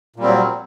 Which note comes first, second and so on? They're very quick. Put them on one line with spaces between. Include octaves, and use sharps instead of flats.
A#2 G3 C4 F#3